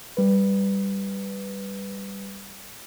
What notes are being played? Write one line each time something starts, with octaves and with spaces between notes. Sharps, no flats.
G3 B4